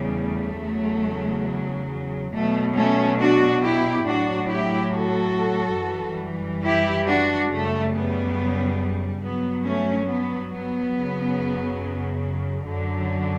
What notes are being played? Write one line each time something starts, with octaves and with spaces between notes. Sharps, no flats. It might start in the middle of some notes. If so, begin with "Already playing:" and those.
Already playing: E2 C#3 G3
A3
E2 C#3 F#3
B2 F#3 A3
A3 C#4
D4 F#4
E4 G4
A2 F#3 D4 F#4
E4 G4
F#4 A4
F#2 E3 G3
E4 G4
D4 F#4
F#2 C#3 G3 A3
B3
G2 F#3 B3
A3 C#4
B3
B3
F#2 C#3 F#3
F#2 D3 F#3